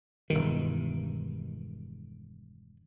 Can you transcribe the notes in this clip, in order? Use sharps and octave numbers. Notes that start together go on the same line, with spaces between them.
E1 G2 D#3